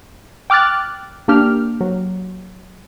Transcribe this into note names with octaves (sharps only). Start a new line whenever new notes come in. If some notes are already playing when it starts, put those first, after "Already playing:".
G5 D6 F6 F#6 A6
A#3 D4 G4 F6
F#3